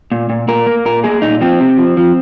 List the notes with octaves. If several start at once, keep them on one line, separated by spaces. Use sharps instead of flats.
A#2
A#2
A#2 A#4
A#3
A#2 A#4
A#3 G#4
A#2 D#4
F3 C4
C3
F3
F3